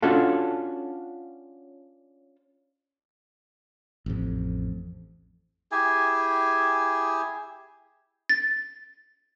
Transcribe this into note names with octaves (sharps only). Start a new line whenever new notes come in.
C#4 D4 F4 F#4 A4
A1 F2
E4 G4 G#4 G#5
A6